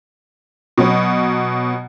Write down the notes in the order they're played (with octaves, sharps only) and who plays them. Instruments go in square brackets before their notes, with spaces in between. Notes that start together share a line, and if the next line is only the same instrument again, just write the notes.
[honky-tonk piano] B2 F#3